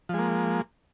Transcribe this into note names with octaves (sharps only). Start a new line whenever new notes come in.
F3 G#3 A#3